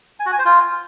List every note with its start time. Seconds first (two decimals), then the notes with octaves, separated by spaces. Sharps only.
0.20 G#5
0.26 F#4
0.32 G#5
0.39 C5
0.45 F4